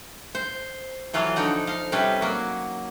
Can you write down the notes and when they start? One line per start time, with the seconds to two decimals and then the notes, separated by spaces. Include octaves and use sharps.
0.35 C5
1.14 E3 F#3 F4 A4
1.36 D3 F3 D#4 F#5
1.67 D#5 F5
1.92 C3 G3 C#4 A4 B4
2.21 F#3 A#3 F#4